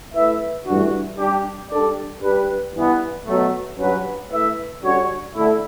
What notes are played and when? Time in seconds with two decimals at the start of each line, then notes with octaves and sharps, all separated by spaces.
0.14 A3 E4 B4 E5
0.66 G2 E3 A3 D4 F#4
1.18 G3 D4 G4
1.70 G3 D4 A4 D5
2.21 G3 D4 G4 B4
2.73 G2 E3 B3
3.25 B2 F#3 A3
3.77 G2 F#3 C#4 F#4 B4
4.30 A3 E4 B4 E5
4.82 D3 G3 C#4 F#4 C#5
5.34 D3 A3 E4